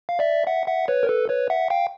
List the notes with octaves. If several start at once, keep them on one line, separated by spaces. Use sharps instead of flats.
F5
D5 E5
E5 F#5
E5 F#5
B4 C#5
A#4
A4 B4
B4 C#5
E5 F#5
F5 G5